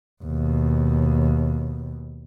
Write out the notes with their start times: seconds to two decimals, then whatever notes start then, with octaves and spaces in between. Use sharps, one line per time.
0.23 D#2 B2